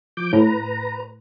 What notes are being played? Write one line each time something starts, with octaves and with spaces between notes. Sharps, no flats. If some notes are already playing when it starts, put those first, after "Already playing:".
F3 D6 G6
A2 B4 A#5